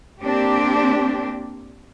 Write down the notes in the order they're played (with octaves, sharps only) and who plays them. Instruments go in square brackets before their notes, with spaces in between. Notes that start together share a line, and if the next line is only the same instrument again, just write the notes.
[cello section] A#3 C4 D4 G4